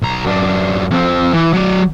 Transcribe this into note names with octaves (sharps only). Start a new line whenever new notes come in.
B1 A#5
F#2 D4
F2 C4
E3
F#3 D5